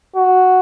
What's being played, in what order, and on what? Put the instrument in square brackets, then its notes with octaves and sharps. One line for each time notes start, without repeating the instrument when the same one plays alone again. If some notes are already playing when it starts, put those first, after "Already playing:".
[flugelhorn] F#4